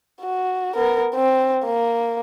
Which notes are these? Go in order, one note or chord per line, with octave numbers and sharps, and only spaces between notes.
F#4
B3 A#4
C4
A#3